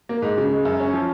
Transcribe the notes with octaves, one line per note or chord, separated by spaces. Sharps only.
A#3
G#2
C#3
G#3
F#2
C#4
F3